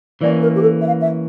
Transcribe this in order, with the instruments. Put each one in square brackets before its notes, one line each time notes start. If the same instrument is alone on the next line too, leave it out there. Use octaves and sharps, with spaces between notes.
[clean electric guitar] E3 A#3 C#4 [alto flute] D5
[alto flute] A#4
G4
A4
E5
F5
E5